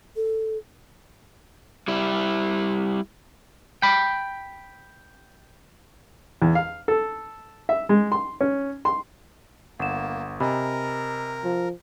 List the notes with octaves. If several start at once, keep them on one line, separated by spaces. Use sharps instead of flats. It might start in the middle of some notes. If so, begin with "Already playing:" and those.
A4
G3 E4
G5 B5
E2
F5
A4
E5
G#3
C6
C#4
C6
G1 A#3 F#5 E7
C3 A#4 D#5 G#5 B5
F3